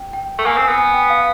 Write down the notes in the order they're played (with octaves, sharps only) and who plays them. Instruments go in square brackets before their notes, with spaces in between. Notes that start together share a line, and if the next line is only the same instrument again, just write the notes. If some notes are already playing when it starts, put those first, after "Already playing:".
Already playing: [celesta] G5
G5
[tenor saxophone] A3
[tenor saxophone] A#3 [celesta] G#5
[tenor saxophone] C4
[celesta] G#5
[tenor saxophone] B3
[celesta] G#5
G5
F5